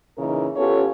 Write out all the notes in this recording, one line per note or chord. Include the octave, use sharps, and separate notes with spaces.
A#2 C#3 E3 D#4 A#4
B3 C#4 F4 G4 A4 C#5